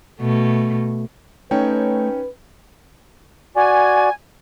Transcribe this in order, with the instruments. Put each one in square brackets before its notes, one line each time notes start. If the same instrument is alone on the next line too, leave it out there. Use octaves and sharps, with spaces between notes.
[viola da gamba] B2 A3
[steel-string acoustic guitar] A3 C#5 [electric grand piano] C#4 D#4 G5 [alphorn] B4
[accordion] F#4 D5 [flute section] G#5